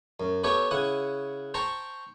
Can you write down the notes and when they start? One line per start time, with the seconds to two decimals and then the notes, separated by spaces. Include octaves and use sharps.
0.20 F#2
0.44 B3 G4 A4 C#5 E5 G5
0.71 C#3 E4 F#5 D#6
1.54 C5 G5 A5 A#5 C#6